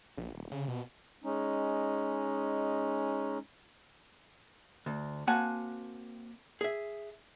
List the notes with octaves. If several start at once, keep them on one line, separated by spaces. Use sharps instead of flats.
A#1
D#1
C#3
B2
G#3 C#4 D#4
D2
A#3 C4 F#4 F#5 G#5 A5
G#4 E5